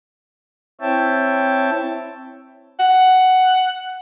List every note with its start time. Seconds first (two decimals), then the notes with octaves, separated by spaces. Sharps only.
0.81 C4 E4 C#5 E5 G5 A5
2.79 F#5